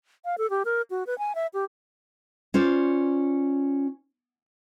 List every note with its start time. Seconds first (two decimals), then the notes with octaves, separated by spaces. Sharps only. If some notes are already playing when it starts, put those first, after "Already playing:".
0.25 F5
0.38 A4
0.50 G4
0.65 A#4
0.90 F#4
1.07 B4
1.19 G#5
1.35 E5
1.54 G4
2.54 C#4 F4 C5 D5